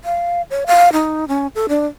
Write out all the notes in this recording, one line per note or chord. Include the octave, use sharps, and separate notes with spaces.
F5
C#5
F5
D#4
C#4
A4
D4